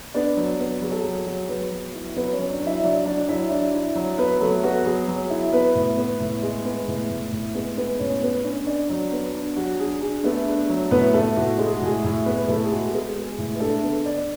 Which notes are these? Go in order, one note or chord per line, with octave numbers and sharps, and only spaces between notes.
B3 D4 D5
F#3
B3
F#3 G#4
A4
F#3 G#4
F#3
F#3 B3 B4
F#3
E4
F#3 B3 B4
C#4 C#5
F#3
D4 D5
F#3
E4 E5
F#3 D4 D5
F#3 D4 D5
F#3 E4 E5
D4 E4 D5
E4
F#3
B3 B4
F#3 A3 A4
B3 F#4
F#3 G#4
F#3
E4
B3 B4
A2
B3
A2
G#3
B3
A2
A2
A2
G#3 B3 B4
B3 B4
A2 C#4 C#5
B3 B4
C#4 D4 C#5
D4 D5
F#3 D4 D5
B3
D4
F#3 F#4
D4 G#4
D4 G#4
A3 B3 A4
D4
F#3
A2 B3 B4
A2 A3 A4
A2 F#4
G#3 A4
G#4
F#4
A2 G#4
A2
B3 B4
B4
A2 A3 A4
G#4
G#3 F#4
A4
B3 G#4
G#3
A2
B4
A3 D4 A4
D3 B3 B4
D3 D4 D5